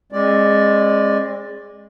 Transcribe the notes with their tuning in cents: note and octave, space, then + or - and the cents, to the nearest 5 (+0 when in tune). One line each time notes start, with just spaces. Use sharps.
G#3 -10 C4 +45 D5 +0